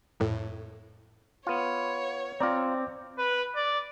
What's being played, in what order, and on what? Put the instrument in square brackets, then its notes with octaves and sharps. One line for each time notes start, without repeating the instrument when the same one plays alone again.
[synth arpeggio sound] F2 A2
[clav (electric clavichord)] B3 F4 [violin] C#5
[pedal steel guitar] C4 [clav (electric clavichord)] F4 A#5 [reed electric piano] D5 D6
[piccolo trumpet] B4
D5